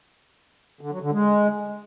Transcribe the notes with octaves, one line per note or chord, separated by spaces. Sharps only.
D3
F#3
D3
G#3